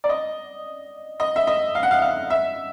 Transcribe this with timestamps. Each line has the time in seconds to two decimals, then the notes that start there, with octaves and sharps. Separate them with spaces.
0.04 D5
0.09 D#5
1.20 D#5
1.36 E5
1.47 D#5
1.75 F5
1.83 F#5
1.91 F5
2.02 F5
2.30 E5